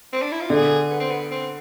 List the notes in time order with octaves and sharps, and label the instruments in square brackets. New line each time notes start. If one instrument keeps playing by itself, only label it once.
[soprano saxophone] C4
D4
E4
F4
[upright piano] D3 [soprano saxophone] G#4
[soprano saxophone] B3
C4
B3
C4